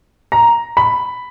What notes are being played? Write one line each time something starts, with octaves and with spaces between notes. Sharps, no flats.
A#5
B5